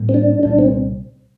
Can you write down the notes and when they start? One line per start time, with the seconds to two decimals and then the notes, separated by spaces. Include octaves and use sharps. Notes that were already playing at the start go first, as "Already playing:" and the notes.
Already playing: A1 A2 G3 A#3
0.09 C4
0.14 D4
0.43 C2 A#2 G3 A#3 D4
0.59 C4